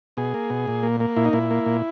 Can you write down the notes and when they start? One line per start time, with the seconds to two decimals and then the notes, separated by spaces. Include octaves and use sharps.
0.17 B2 G#4
0.34 A#3
0.50 B2
0.68 A#2
0.83 A#3
1.00 A#3
1.16 A#2 E4
1.25 D#4
1.33 A#2 E4
1.51 A#3
1.66 A#2